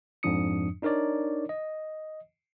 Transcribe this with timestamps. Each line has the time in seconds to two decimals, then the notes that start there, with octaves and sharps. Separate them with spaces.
0.23 F2 G#2 F3 D4 D#6 C#7
0.82 D4 D#4 A#4 C#5 D5
1.49 D#5